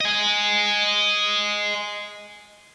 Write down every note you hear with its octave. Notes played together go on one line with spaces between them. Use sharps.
D#5 G#5